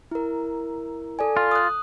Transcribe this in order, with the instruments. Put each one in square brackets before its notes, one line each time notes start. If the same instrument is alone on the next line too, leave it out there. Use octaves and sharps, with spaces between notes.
[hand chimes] E4 A#4
A4 D5 G#5
[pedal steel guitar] F4
[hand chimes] D#6 F#6